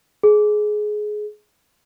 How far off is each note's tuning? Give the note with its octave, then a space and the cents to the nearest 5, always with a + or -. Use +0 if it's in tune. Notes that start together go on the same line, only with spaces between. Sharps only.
G#4 +20